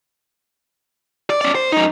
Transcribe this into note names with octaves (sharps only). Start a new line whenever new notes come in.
D5
C#4 D5
C5
F#2 D#4